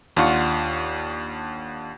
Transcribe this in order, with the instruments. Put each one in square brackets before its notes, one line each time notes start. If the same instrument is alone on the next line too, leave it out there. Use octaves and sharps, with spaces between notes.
[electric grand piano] D#2 D4 F4 F5 F#5 C#6